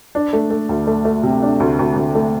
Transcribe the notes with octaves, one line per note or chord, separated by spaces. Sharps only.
D4
A3
A3
D2
A3
A3
C3
D4
D2
D2
D2
A3